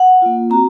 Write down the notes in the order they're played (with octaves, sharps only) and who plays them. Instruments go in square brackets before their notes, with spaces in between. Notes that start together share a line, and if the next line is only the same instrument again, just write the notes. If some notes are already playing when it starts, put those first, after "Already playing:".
Already playing: [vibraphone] F#5
A#3 F4
C4 F#4 A#5